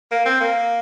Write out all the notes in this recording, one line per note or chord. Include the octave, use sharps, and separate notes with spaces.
A#3
C4
A#3